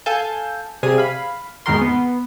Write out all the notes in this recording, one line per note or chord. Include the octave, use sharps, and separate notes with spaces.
A4 F5 G#5 A5 G6
C3 G3 G#4 G#5 D#7
F5 B5
E2 G#2 D#3 F#4 A#4 C6
B3